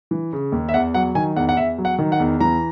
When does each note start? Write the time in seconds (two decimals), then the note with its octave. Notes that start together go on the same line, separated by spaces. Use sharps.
0.11 E3
0.33 C#3
0.52 D#2
0.69 E5
0.74 E2 F#5
0.94 F#3 F#5
1.15 D#3 G#5
1.36 E2 F#5
1.49 F#5
1.57 E2 E5
1.78 F#3
1.85 F#5
1.98 D#3
2.12 F#5
2.20 E2
2.40 E3 A#5